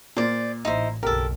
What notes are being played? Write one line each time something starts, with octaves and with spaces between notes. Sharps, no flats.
A#2 C5 D5
A1 D#4 E4 C5
F#1 B1 G4 A4 A#4